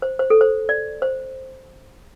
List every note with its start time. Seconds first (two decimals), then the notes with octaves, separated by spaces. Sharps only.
0.02 C5
0.19 C5
0.30 A4
0.41 C5
0.69 D5
1.02 C5